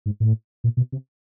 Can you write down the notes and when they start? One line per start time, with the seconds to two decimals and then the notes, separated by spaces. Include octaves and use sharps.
0.06 G#2
0.20 A2
0.64 A#2
0.77 B2
0.92 C3